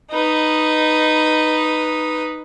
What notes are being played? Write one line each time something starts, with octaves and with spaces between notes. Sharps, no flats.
D#4 B4